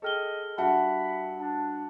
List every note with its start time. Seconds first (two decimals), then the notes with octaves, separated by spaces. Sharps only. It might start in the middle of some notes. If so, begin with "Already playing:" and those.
0.02 G#4 A4 D#5 G5 F6 G7
0.58 G2 F#4 E5 F#5 A5 B5
1.39 D4 A5